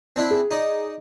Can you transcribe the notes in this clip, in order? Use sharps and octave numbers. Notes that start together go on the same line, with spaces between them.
C4 D4 E4
G#4
D#4 D5